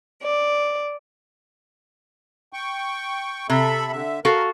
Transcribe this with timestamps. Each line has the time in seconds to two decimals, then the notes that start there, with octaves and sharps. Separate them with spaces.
0.22 D5
2.53 G5 C#6
3.50 C3 A4 E5 B5
3.92 D3 E5
4.25 F#4 A4 A#4 F5